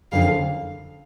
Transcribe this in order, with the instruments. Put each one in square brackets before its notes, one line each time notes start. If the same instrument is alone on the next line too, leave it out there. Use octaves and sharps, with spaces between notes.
[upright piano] F#1 F2 D3 [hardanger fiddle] F5